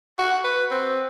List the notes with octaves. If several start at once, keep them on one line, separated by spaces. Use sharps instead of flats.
F#4
B4
C4